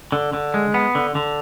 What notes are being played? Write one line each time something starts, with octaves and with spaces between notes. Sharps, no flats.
D3
D3
G#3
B3
D3
D3